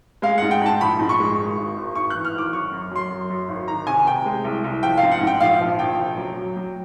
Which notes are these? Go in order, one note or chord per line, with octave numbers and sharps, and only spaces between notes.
G#3 F5
G#2 F#5
G5
G#2 A5
A#1 B5
G#2
C#6
G#3
G#1
G#1
G#1
G#1 C#6
E3 F#6
F6
G#1 D6
F#2 C#6
F#2
F#3 C6
F#2
F#2
G#1
D#3 A#5
C3 G#5
C3 G5
G#3
C2
C2
F3 G5
F5
G#2
F#5
G#2
G5
A#1 F5
F3
A#1 G5
F1
F#3
F#3
F#3